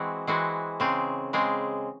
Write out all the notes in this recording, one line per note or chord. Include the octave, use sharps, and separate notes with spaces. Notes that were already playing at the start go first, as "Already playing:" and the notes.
Already playing: E3 G#3 C4 F#4
E3 G#3 C4 F#4
C#3 G#3 C4
C#3 G#3 C4